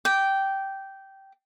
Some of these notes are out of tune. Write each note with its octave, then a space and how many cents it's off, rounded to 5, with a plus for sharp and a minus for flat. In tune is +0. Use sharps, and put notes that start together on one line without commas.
G5 -10 D6 -5